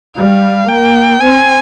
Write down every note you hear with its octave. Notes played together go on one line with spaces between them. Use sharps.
G3 F5
A#3 G5
C4 G#5